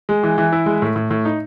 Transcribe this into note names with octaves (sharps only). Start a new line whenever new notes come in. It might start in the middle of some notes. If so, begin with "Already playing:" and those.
G#3
E3
E3
E4
G#3
A2
A2
A2
D#4